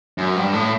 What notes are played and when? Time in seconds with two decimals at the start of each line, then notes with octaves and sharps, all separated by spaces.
0.18 F#2
0.36 G2
0.53 A2